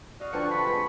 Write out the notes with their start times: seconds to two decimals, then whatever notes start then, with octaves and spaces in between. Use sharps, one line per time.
0.20 F#4 D5 D#5 F5
0.33 D3 F3 C4 B4 A5 C#6 C#7
0.51 B5
0.67 G#3